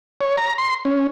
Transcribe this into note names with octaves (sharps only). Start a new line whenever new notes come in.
C#5
A#5
C6
C#4